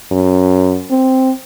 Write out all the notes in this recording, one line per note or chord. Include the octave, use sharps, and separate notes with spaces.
F#2
C4